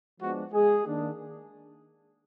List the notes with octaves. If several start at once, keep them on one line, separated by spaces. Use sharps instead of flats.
F3 G#3 B3 D4 F#4
G#3 G#4
D#3 A#3 D4